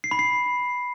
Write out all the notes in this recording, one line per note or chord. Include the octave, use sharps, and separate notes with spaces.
C7
B5
C7